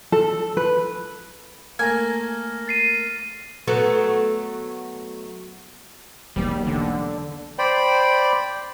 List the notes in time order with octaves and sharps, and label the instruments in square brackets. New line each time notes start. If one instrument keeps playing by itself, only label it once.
[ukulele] A4
B4
[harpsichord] A3 A#3 [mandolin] G#5 [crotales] F6 A#6
[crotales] A6 C7 D#7
[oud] F#3 A3 B3
[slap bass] E1 B1 A#3 [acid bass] G3
[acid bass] D3
[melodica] C5 D5 G5 B5